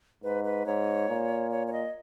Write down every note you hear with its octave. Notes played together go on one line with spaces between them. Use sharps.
G#2 B4
B4
G#2 C#5
A#2
C#5
C#5
D#5